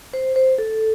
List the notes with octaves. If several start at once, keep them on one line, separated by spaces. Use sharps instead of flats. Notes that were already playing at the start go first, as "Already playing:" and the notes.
C5
C5
A4